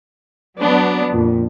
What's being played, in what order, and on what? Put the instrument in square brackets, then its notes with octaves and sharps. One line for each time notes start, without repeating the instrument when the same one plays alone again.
[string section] F#3 B3 D4
[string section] F2 [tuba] A#2